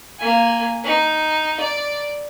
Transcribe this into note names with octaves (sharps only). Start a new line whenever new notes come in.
A#3 G#5
D#4
D5